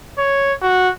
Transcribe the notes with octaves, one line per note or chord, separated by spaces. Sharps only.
C#5
F#4